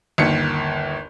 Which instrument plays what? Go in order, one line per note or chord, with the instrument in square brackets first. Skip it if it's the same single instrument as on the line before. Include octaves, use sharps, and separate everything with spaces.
[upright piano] G1 D#2 C#7